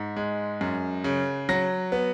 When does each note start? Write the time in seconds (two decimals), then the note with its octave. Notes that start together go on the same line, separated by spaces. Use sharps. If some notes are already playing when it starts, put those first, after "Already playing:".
Already playing: G#2
0.16 G#3
0.61 F#2
1.04 C#3
1.49 F#3 A#6
1.92 B3